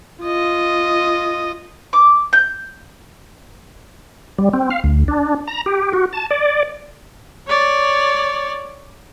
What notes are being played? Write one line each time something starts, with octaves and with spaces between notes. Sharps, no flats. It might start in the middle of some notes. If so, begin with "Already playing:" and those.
F4 D#5
D6
G6
G3
C4
F5
D2
D4
A#5
G4
F#4
A5
D5
C#5 D5